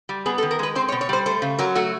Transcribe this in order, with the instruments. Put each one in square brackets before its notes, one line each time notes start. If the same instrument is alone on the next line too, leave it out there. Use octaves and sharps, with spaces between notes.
[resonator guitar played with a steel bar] G3
B3 G#4
A4
D#3
A#4
G#3 B4
C4 C5
C#5
B2
C#5
G3 C5
A3 C5
C#3
F#3 A#4
A3 F#4